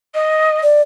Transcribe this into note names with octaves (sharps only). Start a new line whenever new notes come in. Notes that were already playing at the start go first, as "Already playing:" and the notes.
D#5
D5